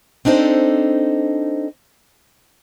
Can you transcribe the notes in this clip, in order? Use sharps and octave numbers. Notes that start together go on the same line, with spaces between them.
C4 D4 D#4 A4 C5 D5